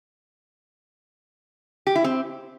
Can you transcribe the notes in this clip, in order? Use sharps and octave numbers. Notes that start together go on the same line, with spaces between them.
G4
E4
C4